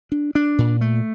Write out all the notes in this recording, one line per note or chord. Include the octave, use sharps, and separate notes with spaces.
D4
D4
A#2
A3